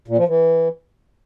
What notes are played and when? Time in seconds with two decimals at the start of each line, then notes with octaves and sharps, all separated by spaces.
0.08 A#2
0.18 F3
0.28 E3